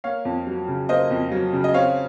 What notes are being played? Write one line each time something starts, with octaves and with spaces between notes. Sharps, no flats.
A#3 C#5 F5
F2
F#3
C#3
A#3 C5 D#5
F2
F#3
C#3
D#5
C4 C#5 F5